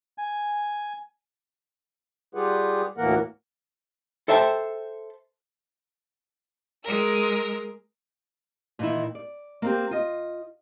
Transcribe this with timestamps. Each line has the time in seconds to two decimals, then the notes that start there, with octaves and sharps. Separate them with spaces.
0.18 G#5
2.35 G3 F4 G4 G#4 B4 F#5
2.98 D2 A2 E3 A#3 A#4 F#5
4.28 A4 C5 E5 G5 A5
6.83 G#3 A#4 E6
8.79 A#2 D#3 E3 D#4 E4
9.15 D5
9.62 A#3 C4 G4
9.91 F4 D#5